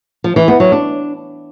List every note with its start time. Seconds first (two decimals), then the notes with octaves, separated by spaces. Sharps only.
0.24 F3
0.36 E3
0.48 B3
0.60 F#3
0.72 D4